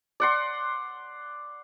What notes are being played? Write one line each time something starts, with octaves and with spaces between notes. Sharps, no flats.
D5 F#5 C6